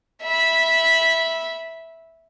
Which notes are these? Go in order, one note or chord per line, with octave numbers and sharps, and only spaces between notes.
E5 B5